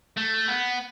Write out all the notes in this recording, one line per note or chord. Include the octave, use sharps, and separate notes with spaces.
A3
B3